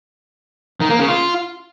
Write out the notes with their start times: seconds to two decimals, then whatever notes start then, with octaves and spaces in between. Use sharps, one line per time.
0.81 D#3
0.90 A#3
0.99 C#3
1.08 F4